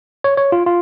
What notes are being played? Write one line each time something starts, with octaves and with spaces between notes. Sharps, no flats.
C#5
C#5
F4
F4